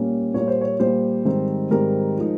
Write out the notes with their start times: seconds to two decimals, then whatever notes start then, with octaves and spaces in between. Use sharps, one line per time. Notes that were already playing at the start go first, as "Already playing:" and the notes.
Already playing: A#2 G3 A#3 C#4
0.34 A#2 G3 A#3 C#5
0.48 C5
0.61 C#5
0.80 A#2 G3 A#3 C5
1.25 G#2 D#3 G3 C4
1.71 G#2 D#3 G3 C4 A#4
2.18 F3 G#3 D#4